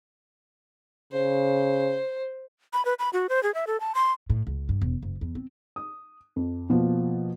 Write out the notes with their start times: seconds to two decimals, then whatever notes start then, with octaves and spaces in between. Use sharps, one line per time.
1.13 C#3 C5
2.73 B5
2.85 B4
2.99 B5
3.13 F#4
3.29 C5
3.43 G#4
3.54 E5
3.67 A4
3.80 A5
3.95 C6
4.30 A2
4.47 C#2
4.69 G2
4.82 E1
5.03 F#1
5.21 E2
5.35 C4
5.76 D#6
6.36 F2
6.70 B2 F3 A#3